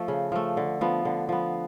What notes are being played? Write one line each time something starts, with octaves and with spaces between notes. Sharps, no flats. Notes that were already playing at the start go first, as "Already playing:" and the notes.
Already playing: F3 A3
C#3
F3 A3
D3
F3 B3
D3
F3 B3